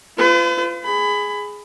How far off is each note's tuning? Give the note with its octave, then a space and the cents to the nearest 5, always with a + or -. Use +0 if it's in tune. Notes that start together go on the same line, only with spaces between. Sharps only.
F4 -25 B4 +45
G#4 +0 B5 +20